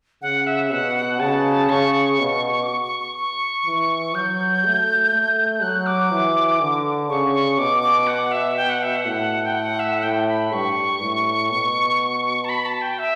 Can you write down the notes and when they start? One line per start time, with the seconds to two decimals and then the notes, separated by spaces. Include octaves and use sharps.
0.22 C#3 F#5
0.47 E5
0.72 B2 F#5
0.96 F#5
1.20 C#3 A5
1.69 C#3 C#6
2.19 B2
2.62 D6
2.67 C#6
2.84 C#6
3.00 C#6
3.17 C#6
3.66 E3
4.15 F#3 G6
4.64 A3
5.13 A3
5.62 F#3 F#6
5.87 D6
6.11 E3
6.60 D3
7.09 C#3 C#6
7.34 C#6
7.58 B2 D6
7.83 D6
8.07 F#5
8.31 E5
8.56 G5
8.69 F#5
8.83 E5
8.96 F#5
9.05 A2
9.44 G5
9.55 F#5
9.79 E5
9.98 F#5
10.03 A2 G5
10.28 B5
10.53 G2 C#6
11.02 A2
11.51 B2
12.44 A5
12.49 B5
12.66 A5
12.82 G5
12.99 E5